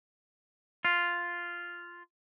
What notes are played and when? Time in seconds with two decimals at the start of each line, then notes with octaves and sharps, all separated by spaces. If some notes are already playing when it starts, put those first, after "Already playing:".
0.85 F4